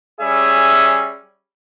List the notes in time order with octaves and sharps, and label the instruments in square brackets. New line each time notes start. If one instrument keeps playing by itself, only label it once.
[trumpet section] G3 C#4 G#4 E5